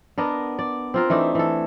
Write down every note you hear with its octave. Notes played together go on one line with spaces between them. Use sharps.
B3 D4 A#4 D#5
D5
C4 F4 A#4
E3 A3 D4 D#4
E3 A4